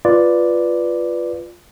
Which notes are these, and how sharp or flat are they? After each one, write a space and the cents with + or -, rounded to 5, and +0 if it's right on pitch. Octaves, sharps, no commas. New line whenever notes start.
F4 +0 B4 +0 D5 +0